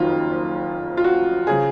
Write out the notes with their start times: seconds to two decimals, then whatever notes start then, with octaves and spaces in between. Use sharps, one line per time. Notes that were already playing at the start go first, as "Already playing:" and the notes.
Already playing: F#1 F2 D#3 F#3 F4
0.97 F4
1.04 F#4
1.47 C#3 F3 G#4